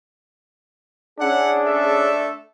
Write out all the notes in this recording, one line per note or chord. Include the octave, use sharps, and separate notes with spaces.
C#4 D4 E4 G#4 F#5
A3 A4 E5